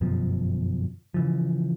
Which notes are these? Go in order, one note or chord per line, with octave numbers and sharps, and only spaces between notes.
G1 F#2 B2 F3
C#3 E3 F3